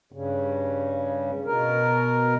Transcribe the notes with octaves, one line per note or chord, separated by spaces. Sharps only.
G2 C#3
B2 A#4